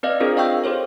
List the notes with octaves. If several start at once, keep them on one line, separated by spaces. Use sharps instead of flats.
C4 B4 D5 D#5 F5
C4 D4 F4 G#4 A#4 C5
D#5 F5 G5 C#6 E6 G6
G4 A4 C5 C#5